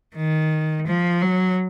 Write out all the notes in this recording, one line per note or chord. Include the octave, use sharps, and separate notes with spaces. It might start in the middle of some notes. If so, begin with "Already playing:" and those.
D#3
F3
F#3